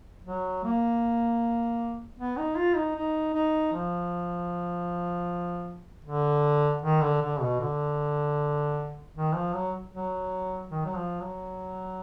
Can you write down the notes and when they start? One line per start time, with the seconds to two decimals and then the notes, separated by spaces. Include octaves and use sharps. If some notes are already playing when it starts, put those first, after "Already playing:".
0.25 F#3
0.64 A#3
2.19 B3
2.37 D#4
2.56 F4
2.76 D#4
2.96 D#4
3.34 D#4
3.73 F3
6.05 D3
6.82 D#3
7.02 D3
7.22 D3
7.41 B2
7.60 D3
9.15 D#3
9.34 F3
9.54 F#3
9.93 F#3
10.70 D#3
10.85 F#3
10.95 F3
11.21 F#3